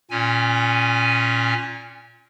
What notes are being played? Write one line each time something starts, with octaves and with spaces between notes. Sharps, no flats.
A#2 C#4 G#5